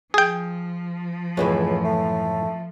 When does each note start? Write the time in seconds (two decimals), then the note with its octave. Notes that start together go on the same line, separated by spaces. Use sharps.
0.14 F3 G#4 G5
1.37 C#2 F#2 A2 E3
1.84 A3